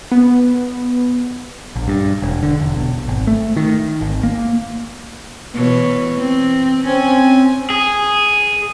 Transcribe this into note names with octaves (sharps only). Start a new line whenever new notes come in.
B3
A#1
G2
E1
D3
E1
B1
G#1
A3
D#3
G#1
A#3
B2 E3 C#5
C4
C4 C#4 G#5
G#4